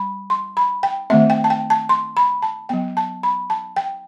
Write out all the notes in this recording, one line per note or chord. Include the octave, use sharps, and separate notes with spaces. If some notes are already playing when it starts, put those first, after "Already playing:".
Already playing: G3 B5
C6
B5
G5
D#3 A3 C4 E5
G5
A5
G5
A5
C6
B5
A5
F#3 B3 G5
A5
B5
A5
G5